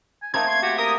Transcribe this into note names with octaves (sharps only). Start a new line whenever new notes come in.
G#5
A3 A#3 C4 D#4 G#6
C6
F#4 G4
A#4 D#6